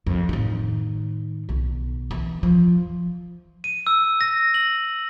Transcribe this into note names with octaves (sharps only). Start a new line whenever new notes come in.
F2
A2 D#3
B1
E3
F3
D#7
E6
A#6
F#7